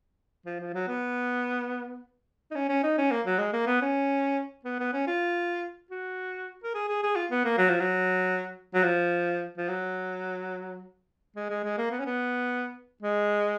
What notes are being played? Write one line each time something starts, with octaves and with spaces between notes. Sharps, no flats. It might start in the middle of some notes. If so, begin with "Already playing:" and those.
F3
F3
F#3
B3
D#4
C#4
C#4
D#4
C#4
A#3
F#3
G#3
A#3
B3
C#4
B3
B3
C#4
F4
F#4
A#4
G#4
G#4
G#4
F4
B3
A#3
F#3
F3
F#3
F#3
F3
F3
F#3
G#3
G#3
G#3
A#3
B3
C#4
B3
G#3